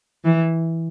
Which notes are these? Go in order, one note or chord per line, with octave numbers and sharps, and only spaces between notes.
E3